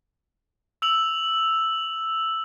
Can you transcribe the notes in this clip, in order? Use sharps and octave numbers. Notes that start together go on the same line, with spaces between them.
E6 F7 F#7